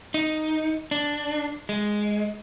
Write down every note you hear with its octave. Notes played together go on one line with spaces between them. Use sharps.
D#4
D4
G#3